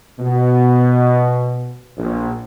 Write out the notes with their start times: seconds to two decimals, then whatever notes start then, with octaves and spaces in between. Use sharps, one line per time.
0.19 B2
1.97 A#1